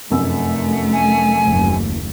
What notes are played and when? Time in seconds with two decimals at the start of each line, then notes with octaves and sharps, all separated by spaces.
0.10 F1 F#2 A3 E6
0.93 G#5
1.47 F#1 D#2